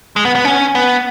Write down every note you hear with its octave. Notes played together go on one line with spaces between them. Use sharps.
G#3
B3
B3
C#4
B3